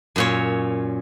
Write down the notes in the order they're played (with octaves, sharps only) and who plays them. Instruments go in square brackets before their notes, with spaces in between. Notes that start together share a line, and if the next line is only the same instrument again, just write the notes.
[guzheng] F#2 A#2 C#5